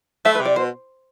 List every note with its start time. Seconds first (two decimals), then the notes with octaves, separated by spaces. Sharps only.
0.25 A3 E5
0.35 B4
0.41 C3 D5
0.56 B2 C5